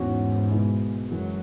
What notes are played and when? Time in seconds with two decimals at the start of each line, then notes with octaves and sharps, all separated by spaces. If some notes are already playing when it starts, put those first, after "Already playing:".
Already playing: E2 G#2 E3 C#4 F#4
0.51 B2 G#3 E4
1.08 F#2 E3 F#3 G#3